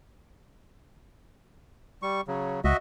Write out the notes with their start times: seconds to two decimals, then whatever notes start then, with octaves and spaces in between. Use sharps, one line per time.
2.02 G3 C#6
2.28 C#3 F#3
2.64 C#2 F#4 D#5 E5